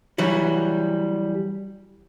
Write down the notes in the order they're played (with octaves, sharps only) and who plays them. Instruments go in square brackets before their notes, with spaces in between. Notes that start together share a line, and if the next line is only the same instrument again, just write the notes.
[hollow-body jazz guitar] E3 F#3 G3